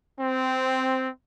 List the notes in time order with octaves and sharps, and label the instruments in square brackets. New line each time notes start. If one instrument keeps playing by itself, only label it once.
[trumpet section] C4